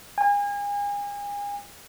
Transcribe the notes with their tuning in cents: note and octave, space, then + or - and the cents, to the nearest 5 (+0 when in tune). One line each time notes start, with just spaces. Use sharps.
G#5 -35